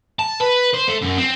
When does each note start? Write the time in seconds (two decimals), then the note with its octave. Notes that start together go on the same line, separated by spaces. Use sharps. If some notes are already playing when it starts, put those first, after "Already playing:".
0.19 A5
0.40 B4
0.73 C5
0.88 A3
1.02 F#2
1.17 C4